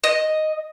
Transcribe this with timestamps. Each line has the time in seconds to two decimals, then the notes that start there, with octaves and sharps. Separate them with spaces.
0.04 D#5